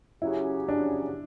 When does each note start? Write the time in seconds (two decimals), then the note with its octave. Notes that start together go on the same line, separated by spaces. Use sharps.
0.21 C#3 F#3 C#4 E4 G4
0.69 D4